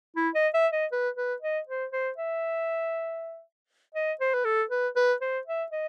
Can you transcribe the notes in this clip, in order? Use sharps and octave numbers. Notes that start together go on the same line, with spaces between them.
E4
D#5
E5
D#5
B4
B4
D#5
C5
C5
E5
D#5
C5
B4
A4
B4
B4
C5
E5
D#5